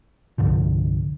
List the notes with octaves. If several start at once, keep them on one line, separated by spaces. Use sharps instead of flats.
C2 G2 D3 F3